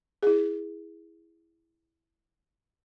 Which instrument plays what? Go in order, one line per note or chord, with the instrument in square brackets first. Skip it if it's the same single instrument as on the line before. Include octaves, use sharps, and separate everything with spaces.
[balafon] E4 G#4